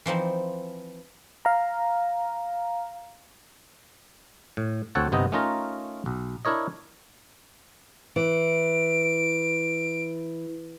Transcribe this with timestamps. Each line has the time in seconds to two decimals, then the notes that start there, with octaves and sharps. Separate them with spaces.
0.06 E3 F3 C4 D#4
1.45 F5 A#5
4.57 A2
4.95 D2 C4 A4 C#5 F#5 A5
5.12 G1 C3 B3 C4 D#4 D#5
5.32 A3 C#4 D#4 F4 A#4 A#5
6.06 B1
6.45 D4 E4 A#4 C#5 D#5
8.16 E3 D7